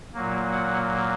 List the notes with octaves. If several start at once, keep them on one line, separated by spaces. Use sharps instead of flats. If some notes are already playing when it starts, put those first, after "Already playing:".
A#2 F#3 A#3
F#5